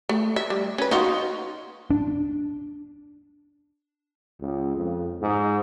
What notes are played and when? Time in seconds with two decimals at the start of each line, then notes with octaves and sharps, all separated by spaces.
0.09 A3
0.36 E5
0.50 G3
0.78 C#4 B4
0.91 D#4 F4 F#4
1.90 D4
4.41 C#2
4.77 F2
5.22 G#2